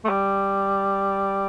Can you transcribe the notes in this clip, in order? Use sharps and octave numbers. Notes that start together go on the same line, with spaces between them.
A3
G3